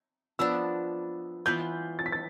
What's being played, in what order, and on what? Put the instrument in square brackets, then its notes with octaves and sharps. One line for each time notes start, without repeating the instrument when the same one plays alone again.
[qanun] F3 B3 D4 [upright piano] E6
[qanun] E3 B3 F4 B4 [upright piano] G6
[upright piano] A6
B6
A6